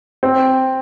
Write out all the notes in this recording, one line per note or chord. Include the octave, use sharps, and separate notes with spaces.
C4